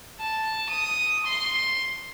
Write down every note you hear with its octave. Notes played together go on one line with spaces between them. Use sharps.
A5
D#6
C6